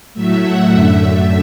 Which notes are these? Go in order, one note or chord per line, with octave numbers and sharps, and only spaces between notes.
A2 F#3 A3 E5
F#5
F#2 D3 A3 E5